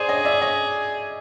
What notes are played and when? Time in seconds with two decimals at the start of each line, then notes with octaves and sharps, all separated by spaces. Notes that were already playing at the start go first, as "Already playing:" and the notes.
Already playing: G#4 C5 D5
0.09 C#5 D#5
0.25 D5 E5
0.42 C#5 D#5